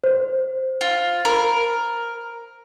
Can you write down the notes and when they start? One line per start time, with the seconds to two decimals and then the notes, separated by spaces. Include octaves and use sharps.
0.04 C5
0.81 F4
1.25 A#4